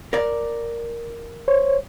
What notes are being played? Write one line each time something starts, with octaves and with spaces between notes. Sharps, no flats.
A#4 D5
C5 C#5